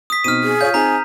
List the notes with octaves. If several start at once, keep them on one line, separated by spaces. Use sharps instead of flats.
D#6 B6
B2 C4 D#4 F6 D#7
G#4
F4 C#5 F5 G6
C4 D#4 G#4 G#5 A#5